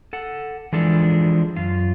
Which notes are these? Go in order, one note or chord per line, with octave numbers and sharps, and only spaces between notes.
A4 F#5
E3 F3 G#3 D4 A4
F#2 F4